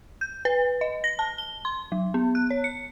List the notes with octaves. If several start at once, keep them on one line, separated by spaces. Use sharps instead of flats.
G6
B4
D#5
A#6
A5
G7
C6
F#3
B3
F#6
C#5
C#7